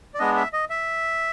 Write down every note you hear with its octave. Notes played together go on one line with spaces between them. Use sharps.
D5
G#3 B3 D4 D#5
E5
D#5
E5